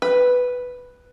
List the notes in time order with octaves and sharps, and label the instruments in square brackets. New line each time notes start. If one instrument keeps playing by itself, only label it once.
[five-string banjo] B4